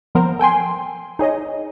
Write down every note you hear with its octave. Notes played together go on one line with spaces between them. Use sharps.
F3 B3 A#4 C5
A4 G5 G#5 C6
D#4 G#4 C#5 D#5